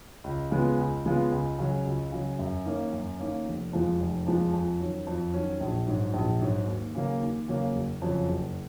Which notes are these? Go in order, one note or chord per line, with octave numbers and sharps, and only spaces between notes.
C#2
C#3 G#3 B3 F4
C#2
C#3 G#3 B3 F4
C#2
C#3 F#3
C#2
C#3 F#3
F#2
D#3 A#3 C#4
F#2
D#3 A#3 C#4
F1
F2 F3 G#3
F1
F2 F3 G#3
F2
D#3 F#3 C#4
F2
D#3 F#3 C#4
A#1
G#2 F#3
A#1
G#2 F#3
D#2
C#3 F#3 A#3
D#2
C#3 F#3 A#3
F#1
F2 C#3 F#3
F#1